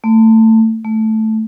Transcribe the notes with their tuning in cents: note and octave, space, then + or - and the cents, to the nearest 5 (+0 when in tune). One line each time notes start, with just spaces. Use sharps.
A3 +20
A3 -5